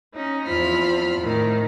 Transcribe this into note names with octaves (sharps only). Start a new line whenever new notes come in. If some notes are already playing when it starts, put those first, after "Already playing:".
C#4 D#4
E2 F3 C4 F4 B5 F6
A2 D#3